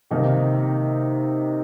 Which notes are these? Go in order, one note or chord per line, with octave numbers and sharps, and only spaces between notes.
C3 D#3 A#3 D#4